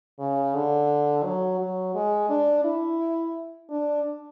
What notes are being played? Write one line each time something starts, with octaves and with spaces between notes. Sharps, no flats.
C#3
D3
F#3
F#3
G#3
D4
E4
D4